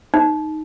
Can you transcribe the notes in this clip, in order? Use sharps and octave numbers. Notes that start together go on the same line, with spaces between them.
D#4